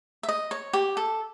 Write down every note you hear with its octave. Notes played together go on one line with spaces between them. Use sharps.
E5
D#5
C#5
G4
A4